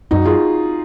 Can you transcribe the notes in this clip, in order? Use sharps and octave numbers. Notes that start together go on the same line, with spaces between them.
F#2 D#4 F#4
F4 G#4